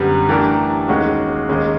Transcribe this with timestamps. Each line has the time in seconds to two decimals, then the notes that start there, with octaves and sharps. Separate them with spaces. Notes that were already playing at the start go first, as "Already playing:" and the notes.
Already playing: F#2 D3 G3 B3
0.29 E3 A3 D4 G4 A#4
0.88 D#2 D#3 G#3 C#4 F#4
1.49 D#2 D#3 G#3 C#4